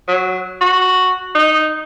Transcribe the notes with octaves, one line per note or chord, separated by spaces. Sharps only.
F#3
F#4
D#4